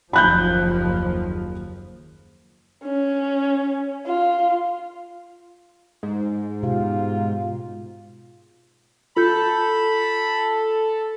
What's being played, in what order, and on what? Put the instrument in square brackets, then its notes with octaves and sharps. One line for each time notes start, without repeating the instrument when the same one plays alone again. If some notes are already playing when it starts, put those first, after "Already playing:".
[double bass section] F#1 D#2 F3 [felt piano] B5 F#6 G6
[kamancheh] C#4
F4
[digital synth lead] G#2
[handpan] B2 G4 F5 [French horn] F4
[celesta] F4 G6 [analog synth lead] A4 [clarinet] B5